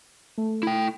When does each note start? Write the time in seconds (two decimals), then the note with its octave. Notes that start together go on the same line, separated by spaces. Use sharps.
0.38 A3
0.63 E4 G5